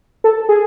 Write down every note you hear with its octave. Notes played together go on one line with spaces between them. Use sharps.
A4
G#4